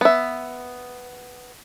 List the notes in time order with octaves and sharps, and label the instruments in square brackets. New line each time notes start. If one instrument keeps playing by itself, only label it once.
[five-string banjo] B3 E5